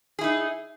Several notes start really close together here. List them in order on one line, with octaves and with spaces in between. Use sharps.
G#4 E4 D#4